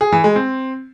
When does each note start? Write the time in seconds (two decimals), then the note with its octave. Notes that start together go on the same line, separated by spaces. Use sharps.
0.01 G#4
0.12 E3
0.24 G#3
0.36 C4